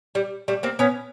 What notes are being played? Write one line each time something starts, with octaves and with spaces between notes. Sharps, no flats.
G3
G3 A3
A#3 C4
B3 C#4